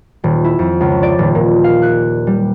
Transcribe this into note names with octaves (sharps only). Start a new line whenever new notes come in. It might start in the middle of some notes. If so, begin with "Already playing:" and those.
D#1
E4
F2
C#2
D5
D#1
A#2
F5
F#6
G3